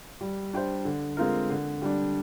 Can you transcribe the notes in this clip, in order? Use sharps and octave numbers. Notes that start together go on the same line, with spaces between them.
G3
D4 G4 C5
D3
G#3 C4 F4 A#4
D3
G3 D4